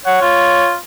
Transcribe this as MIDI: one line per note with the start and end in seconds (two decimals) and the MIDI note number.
0.06 0.72 73
0.06 0.20 78
0.22 0.76 65